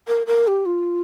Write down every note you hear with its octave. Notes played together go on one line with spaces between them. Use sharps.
A#4
A#4
G4
F4